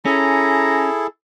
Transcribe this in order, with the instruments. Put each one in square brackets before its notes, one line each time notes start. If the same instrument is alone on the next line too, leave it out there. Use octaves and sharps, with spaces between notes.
[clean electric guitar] C#4 [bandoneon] E4 G#4 A4 [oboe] A#5